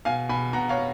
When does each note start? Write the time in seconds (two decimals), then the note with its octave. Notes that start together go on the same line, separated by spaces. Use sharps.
0.05 B2 F5 G#5
0.29 B2 G#5 B5
0.53 B2 F#5 A#5
0.69 C#5 F5
0.78 B2